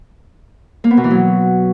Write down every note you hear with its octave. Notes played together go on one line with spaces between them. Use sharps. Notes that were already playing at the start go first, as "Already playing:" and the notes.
A#3
B3
B2
E3
F#3